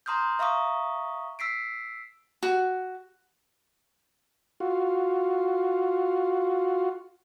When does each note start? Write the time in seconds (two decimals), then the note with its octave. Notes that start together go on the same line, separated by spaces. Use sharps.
0.06 A#5 C6 D#6 F6 G6
0.39 E5 F5 A#5 C#6 D#6
1.39 E6 B6 C7 D7
2.43 F#4
4.60 F4 F#4